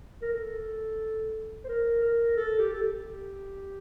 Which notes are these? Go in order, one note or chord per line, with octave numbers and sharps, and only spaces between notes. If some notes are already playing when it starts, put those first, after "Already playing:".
A#4
A4
C5
A#4
A#4
A4
G4
A4
G4